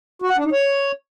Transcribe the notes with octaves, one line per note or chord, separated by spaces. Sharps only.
F#4
F#5
D4
D#4
C#5